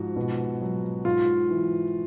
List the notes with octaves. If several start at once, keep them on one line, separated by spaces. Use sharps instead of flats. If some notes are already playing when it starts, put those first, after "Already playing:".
Already playing: G#2 F3 F#4
B2
F#3
G#2 F4
E3